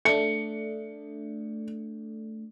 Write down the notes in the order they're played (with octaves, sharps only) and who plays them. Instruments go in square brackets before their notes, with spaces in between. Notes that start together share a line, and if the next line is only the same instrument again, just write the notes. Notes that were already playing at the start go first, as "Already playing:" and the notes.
[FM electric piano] A3 D4 [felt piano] C#7